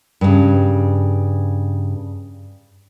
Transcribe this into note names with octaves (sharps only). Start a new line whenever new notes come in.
G2 C#3